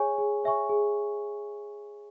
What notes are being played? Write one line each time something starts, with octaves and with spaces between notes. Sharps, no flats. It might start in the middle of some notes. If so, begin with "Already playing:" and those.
Already playing: G#4 C#5 E5 G#5 C#6
G#4
C#5 E5 G#5 C#6
G#4